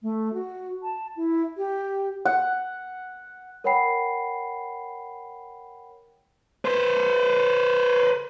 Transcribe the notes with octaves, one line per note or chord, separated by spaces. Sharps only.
A3
F#4
A5
E4
G4
F#5
A#4 C#5 F#5 G5 B5 C7
B4 C5